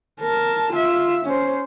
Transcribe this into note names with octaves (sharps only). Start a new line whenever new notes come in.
A#4 A5
F4 E5
C#4 C5